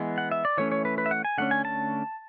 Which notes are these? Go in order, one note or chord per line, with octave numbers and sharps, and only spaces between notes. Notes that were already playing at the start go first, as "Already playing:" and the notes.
Already playing: E3 G#3 B3
F#5
E5
D5
E3 A3 C#4 C#5
C#5
B4
B4
E5
F#5
G#5
D3 A3 C#4 F#5
G#5
A5